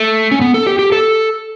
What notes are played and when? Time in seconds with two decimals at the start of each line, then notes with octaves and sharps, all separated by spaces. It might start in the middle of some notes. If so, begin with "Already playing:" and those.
Already playing: A3
0.31 C#4
0.41 B3
0.54 A4
0.67 G4
0.79 G4
0.92 A4